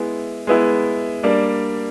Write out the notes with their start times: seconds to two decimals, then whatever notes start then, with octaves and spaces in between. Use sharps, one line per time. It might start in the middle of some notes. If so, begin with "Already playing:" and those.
Already playing: G#3 B3 E4
0.47 G#3 B3 E4
1.23 G3 A#3 D4